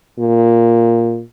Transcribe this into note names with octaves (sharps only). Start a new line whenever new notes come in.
A#2